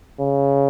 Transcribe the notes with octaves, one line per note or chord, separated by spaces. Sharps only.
C#3